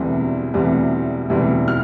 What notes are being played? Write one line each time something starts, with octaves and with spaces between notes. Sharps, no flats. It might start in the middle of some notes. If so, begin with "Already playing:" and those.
Already playing: E1 D2 C3 E3 G3
E1 D2 C3 E3 G3
E1 D2 C3 E3 G3
F6